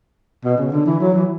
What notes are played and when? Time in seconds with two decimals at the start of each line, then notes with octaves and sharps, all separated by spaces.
0.44 B2
0.58 C#3
0.72 D3
0.86 E3
1.00 F#3
1.14 E3